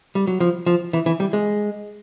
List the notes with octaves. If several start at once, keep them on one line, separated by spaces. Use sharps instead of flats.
G3
F#3
F3
F3
E3
E3
G3
G#3